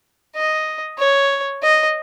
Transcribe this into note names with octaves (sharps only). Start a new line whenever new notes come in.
D#5
C#5
D#5